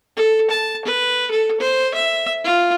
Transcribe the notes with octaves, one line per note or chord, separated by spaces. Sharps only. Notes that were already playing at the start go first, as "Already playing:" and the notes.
A4
A5
B4
A4
C5
E5
F4